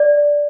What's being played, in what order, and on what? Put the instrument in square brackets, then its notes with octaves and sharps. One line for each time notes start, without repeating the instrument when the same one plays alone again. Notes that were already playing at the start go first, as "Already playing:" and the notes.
Already playing: [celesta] D5